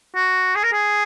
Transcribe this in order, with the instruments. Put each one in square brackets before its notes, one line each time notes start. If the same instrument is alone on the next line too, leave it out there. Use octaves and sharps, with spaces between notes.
[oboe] F#4
G#4
A#4
G#4